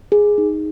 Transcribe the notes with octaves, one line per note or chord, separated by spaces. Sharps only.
G#4
D#4